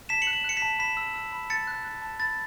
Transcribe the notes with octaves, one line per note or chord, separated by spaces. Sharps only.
A5 B6 E7
C#7 F#7
F#6
F#7
E7
F#6 C#7
B6 E7
A5
B5 B6 E7
E6
E6
B5
A5 A6 C#7
F#6
F#6
A5
B5 A6